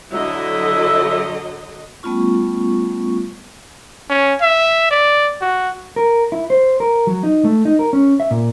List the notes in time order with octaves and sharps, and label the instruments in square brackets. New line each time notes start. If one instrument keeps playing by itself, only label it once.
[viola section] D3 F#3 D#5 [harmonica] E4 E5
[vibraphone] G3 A3 B3 C#4 F4 C#6
[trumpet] C#4
E5
D5
F#4
[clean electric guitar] A#4
E4
C5
A#4
F#3
D#4
A3
D#4
A#4
C#4
E5
A#2